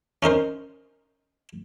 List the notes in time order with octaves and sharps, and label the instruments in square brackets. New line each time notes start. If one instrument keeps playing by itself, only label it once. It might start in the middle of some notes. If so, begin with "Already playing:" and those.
[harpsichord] C#4 D#4 A#4 C5